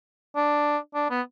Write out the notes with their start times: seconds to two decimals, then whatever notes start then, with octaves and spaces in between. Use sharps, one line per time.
0.36 D4
0.95 D4
1.10 B3